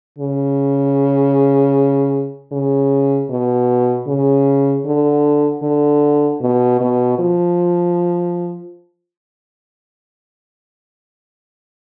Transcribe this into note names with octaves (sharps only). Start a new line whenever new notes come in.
C#3
C#3
B2
C#3
D3
D3
B2
B2
F3